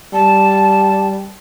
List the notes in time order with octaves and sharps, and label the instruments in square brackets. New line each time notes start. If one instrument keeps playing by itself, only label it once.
[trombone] G3 [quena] A5